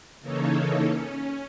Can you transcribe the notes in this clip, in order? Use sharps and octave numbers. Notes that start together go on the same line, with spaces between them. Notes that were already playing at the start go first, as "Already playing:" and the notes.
C#3 E3 A#3 D#4 A4 C#5
C#4